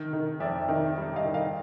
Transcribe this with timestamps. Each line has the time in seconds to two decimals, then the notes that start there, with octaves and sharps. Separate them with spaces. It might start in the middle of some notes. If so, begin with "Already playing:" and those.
Already playing: D#3
0.13 D#3
0.40 F2 D5 E5
0.68 D#3
0.98 G3
1.16 D#5 F5
1.26 D#3
1.34 D#5 F5